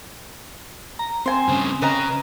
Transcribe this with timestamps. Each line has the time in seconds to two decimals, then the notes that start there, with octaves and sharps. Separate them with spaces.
0.99 A#5
1.26 C4 C5 G#5
1.48 G2 C#3
1.82 C#3 B4 D#5 A#5